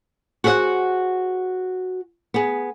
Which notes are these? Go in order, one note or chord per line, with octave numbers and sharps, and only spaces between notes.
F#4 G#4 C5 E5 F#5
B3 G#4